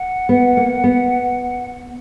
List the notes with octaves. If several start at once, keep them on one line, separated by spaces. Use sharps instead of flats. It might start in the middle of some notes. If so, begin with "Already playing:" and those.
Already playing: F#5
B3
A#3
B3